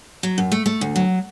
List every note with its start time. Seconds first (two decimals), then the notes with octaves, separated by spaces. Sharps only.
0.23 F#3
0.38 F#2
0.52 A3
0.66 A3
0.81 D2
0.96 F#3